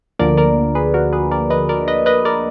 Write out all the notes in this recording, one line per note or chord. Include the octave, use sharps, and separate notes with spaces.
D2 D3 F3 A#3 A#4 D5
A#4 D5
G#4 B4
F#4 A#4
G#4 B4
A#4 D5
B4 D#5
A#4 D5
B4 D#5
B4 D#5
A#4 D5